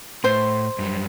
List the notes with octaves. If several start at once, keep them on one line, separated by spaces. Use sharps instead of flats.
A2 C5 C6
F#2 G3